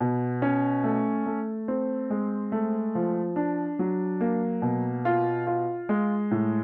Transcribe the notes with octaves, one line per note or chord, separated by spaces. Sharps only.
B2
C#4
A3
A3
C4
G#3
A3
F3
D4
F#3
A#3
B2
F4
F4
G#3
A2